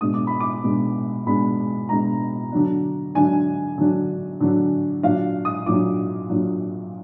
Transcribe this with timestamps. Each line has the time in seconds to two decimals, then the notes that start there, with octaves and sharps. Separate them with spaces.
0.01 B2 G#3 D4 D#6
0.14 D6
0.27 B5
0.40 D6
0.64 B2 G#3 D4
1.26 B2 G#3 D4 B5
1.89 B2 G#3 D4 A#5
2.52 D3 F#3 D4
3.15 D3 F#3 D4 G#5
3.78 D3 F#3 D4
4.40 D3 F#3 D4
5.03 A#2 F#3 D4 F5
5.45 D#6
5.66 A#2 F#3 D4 D6
6.29 A#2 F#3 D4